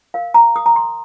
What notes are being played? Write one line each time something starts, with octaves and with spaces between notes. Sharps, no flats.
A#4 F5
A#5
A#4 D#6
A#5
C6